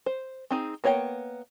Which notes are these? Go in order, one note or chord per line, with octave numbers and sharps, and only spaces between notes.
C5
C4 D#4 G#4
A#3 B3 C#5 D5 G5